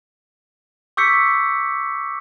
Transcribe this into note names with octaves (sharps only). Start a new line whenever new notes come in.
C#6 D6 E6 G6 B6 C#7